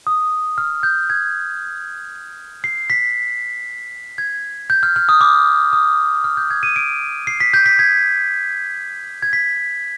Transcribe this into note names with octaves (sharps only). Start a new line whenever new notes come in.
D#6
F6
G6
G#6
C7
B6
G#6
G6
F6
F6
D#6
D6
D#6
F6
G6
G#6
D#7
D7
C7
B6
G6
B6
G#6
G#6
B6